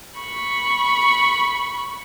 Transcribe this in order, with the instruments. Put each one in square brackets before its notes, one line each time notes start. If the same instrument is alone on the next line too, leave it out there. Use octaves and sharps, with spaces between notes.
[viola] B5 C#6